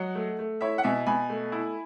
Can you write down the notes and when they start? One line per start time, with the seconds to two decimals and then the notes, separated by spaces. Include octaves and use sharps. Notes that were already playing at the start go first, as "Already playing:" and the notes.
Already playing: F#3 D#5 F#5
0.15 A3
0.39 A3
0.61 E4 C#5 E5
0.78 F#5
0.84 B2 E5 G#5
1.06 B2 G#5 B5
1.29 A3
1.52 E4